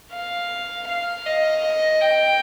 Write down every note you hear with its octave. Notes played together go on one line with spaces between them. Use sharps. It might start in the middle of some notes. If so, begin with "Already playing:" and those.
F5
F5
D#5
G5